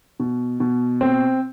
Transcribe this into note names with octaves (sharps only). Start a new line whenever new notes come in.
B2
B2
C4